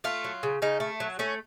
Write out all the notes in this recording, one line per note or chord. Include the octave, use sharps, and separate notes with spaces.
A3 F4
F#3
C#3
C#3 D#4
A3
F#3
A3 C#4